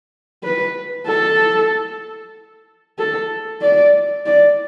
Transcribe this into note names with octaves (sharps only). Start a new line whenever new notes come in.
B4
A4
A4
D5
D5